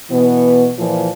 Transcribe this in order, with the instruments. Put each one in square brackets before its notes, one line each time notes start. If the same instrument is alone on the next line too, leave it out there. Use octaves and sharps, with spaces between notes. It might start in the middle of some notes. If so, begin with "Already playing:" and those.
[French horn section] B2 E3 B3
A#2 E3 F3